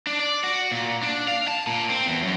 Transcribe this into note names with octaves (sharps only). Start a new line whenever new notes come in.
D4
D5
F#4
A#2
D4
F5
A5
A#2
C4
E2
F#2